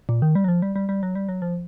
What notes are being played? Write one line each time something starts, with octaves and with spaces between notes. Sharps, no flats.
A#2
D#3
G3
F#3
F3
G3
G3
G3
F#3
G3
F#3
F3